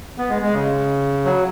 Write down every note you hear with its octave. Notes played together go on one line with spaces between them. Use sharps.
B3
G#3
G#3
C#3
F#3